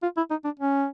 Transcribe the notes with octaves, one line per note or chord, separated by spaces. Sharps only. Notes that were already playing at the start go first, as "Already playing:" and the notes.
F4
E4
D#4
D4
C#4